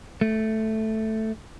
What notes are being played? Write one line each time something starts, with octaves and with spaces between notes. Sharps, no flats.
A3